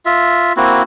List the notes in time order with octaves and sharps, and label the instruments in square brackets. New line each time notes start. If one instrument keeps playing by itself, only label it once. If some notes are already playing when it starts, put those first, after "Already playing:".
[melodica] F4 E5
A#3 C4 E4 F#4